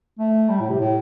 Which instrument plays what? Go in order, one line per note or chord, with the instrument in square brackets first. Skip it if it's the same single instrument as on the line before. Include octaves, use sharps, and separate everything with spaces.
[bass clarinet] A3
G3
A2
C3
A2